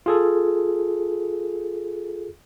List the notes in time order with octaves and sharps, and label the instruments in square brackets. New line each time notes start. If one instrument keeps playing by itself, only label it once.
[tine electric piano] F4 G#4 A4